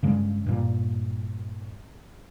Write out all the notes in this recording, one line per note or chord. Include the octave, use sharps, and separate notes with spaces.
G2 C#3 G#3
G2 A#2